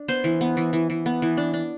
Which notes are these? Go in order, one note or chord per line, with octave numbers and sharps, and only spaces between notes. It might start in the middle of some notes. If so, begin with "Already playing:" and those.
Already playing: D4
B3 C5
E3
B3
E3
E3
E3
B3
E3
D4
D4